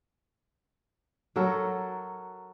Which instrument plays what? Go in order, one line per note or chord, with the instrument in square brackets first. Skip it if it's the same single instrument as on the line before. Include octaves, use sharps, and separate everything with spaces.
[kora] F#3 F#4 A4 A#4